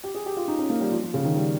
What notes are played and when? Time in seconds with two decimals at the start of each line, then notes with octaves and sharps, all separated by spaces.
0.04 G4
0.15 G#4
0.26 G4
0.37 F4
0.48 D#4
0.59 C#4
0.70 A#3
0.81 G3
0.92 F3
1.03 F3
1.14 C#3
1.25 D#3
1.36 G3